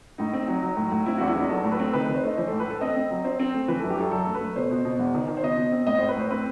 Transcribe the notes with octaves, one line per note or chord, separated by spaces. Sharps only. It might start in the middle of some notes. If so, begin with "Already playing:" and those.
A2 D#4
C4
F#3
F#3
A2
A2
C4 E4
E2 F#4
E4
E2 D#4
F#3 A4
A2
B4
C4
D#3 B4
D#3 B4
C5
A3 D#5
E3 C5
A2 A4
B4
A2 A4
C4 D#5
C4
F#3
C4 C5
C4
A3
E3 B4
F#2 A4
G4
F#2 A4
F#3 A4
A3
B4
A3
B2 C5
B2
B2
E2
D#3
D#3
C5
B2 D#5
B2
C4
A2 D#5
A2 C5
B4
A2 C5
C4 B4